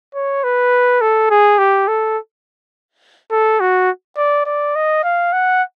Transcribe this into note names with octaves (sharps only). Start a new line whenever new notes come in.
C#5
B4
A4
G#4
G4
A4
A4
F#4
D5
D5
D#5
F5
F#5